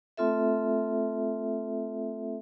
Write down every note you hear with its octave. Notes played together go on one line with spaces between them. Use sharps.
A3 C4 F4 A4 E5